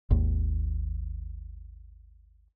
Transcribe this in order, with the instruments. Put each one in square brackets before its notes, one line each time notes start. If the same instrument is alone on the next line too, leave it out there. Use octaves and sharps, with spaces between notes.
[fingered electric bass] G#1 D#2